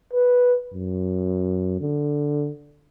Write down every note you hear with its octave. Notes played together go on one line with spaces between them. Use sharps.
B4
F#2
D3